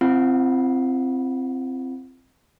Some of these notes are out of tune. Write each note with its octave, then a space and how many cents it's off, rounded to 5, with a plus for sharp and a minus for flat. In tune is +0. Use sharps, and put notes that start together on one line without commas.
C4 +0 F4 -40 F#5 -20